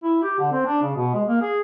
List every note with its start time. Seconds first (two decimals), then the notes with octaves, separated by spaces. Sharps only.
0.04 E4
0.23 G4
0.39 D3
0.52 C4
0.66 D4
0.83 C#3
0.96 B2
1.14 G#3
1.28 A#3
1.42 G#4